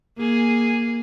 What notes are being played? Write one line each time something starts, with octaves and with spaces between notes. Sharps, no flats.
A#3 G#4